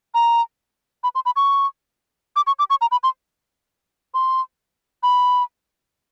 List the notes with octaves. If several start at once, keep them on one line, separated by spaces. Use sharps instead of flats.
A#5
B5
C6
B5
C#6
D6
C#6
D6
C#6
A#5
B5
C6
C6
B5